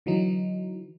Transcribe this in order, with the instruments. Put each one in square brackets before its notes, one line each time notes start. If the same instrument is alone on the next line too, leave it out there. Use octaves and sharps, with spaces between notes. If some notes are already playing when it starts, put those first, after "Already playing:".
[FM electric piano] D3 E3 F#3 D#4